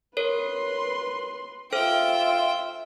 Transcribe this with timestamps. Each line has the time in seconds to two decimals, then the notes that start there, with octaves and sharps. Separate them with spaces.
0.17 A#4 B4 C#5 C6
1.73 F4 A4 C5 E5 G5 F6